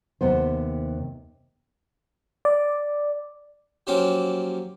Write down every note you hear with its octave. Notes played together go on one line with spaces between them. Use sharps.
D#2 C3 B3 C5
D5
F3 F#3 A#3 C#4 G4